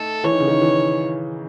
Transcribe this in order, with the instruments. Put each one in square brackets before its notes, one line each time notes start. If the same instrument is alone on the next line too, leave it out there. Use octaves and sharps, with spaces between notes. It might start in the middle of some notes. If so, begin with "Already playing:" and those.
Already playing: [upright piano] A3 D#4 [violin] A4
[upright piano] E3 [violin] C#5
[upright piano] D#3
C#3
D#3
E3